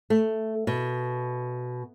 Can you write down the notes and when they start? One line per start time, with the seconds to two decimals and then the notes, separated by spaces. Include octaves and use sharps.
0.10 A3
0.67 B2